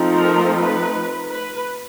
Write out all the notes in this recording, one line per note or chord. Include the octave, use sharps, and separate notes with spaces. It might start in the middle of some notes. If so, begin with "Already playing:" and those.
Already playing: F3 A3 C4 D#4
A#4
B4
B4